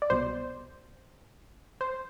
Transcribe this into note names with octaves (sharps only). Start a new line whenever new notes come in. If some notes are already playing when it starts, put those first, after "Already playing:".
D5
C2 B2 C5
C5